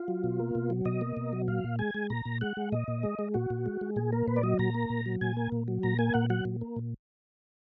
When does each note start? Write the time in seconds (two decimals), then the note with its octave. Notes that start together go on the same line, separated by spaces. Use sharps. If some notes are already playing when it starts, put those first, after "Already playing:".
Already playing: F4
0.08 F#3
0.24 B2
0.39 A#3
0.55 B2
0.70 F#3
0.85 B2 D#5
1.01 A#3
1.17 B2
1.33 F#3
1.48 A#2 F5
1.64 A#2
1.79 G#3 G#5
1.95 G#3
2.10 A#2 A#5
2.26 A#2
2.41 G#3 F#5
2.57 G#3
2.72 A#2 D#5
2.88 A#2
3.03 G#3
3.19 G#3
3.34 A#2 F#4
3.50 A#2
3.66 G#3
3.81 G#3
3.96 A#2 G#4
4.12 A#3 A#4
4.27 A#2 B4
4.36 D5
4.43 F#3 D#5
4.59 A#2 A#5
4.74 A#3
4.90 A#2
5.06 F#3
5.21 A#2 G#5
5.37 A#3
5.52 A#2
5.68 F#3
5.83 A#2 A#5
5.99 A#3 G#5
6.14 A#2 F#5
6.30 F#3 F#5
6.45 A#2
6.61 A#3
6.76 A#2